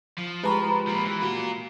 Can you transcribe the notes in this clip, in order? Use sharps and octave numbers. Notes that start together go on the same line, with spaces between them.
F3
G#3 G4 B4 A#5 B5 C#6
F3 A#3
E3
A#3 F4 F#4 A#4